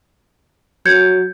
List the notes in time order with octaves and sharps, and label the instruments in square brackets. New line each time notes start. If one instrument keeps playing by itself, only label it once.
[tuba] F#3 [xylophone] G6 G#6 C#7